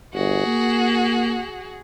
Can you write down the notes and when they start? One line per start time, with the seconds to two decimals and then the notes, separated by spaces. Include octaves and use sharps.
0.14 G1 F#4 G#4
0.46 A#3